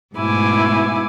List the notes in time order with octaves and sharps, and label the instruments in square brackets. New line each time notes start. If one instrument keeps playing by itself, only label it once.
[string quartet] G#2 B2 A3 E4 G#5 D6